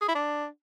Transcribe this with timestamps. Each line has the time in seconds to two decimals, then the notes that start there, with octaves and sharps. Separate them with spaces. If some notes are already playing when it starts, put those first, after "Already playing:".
0.01 G#4
0.08 E4
0.15 D4